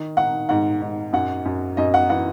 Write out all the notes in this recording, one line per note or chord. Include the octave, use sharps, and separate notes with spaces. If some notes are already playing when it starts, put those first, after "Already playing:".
Already playing: D#3
D#3 F#5
G#2 F#5
G#2
F#2 F#5
F#2
F#2 D#5
F#5
E3 F#5